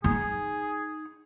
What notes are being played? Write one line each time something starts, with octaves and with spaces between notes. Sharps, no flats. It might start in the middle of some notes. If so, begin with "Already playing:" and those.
D#4 G#4